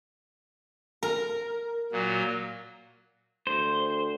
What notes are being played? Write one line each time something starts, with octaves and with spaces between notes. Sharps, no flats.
A#4
A#2 F#3
D2 C5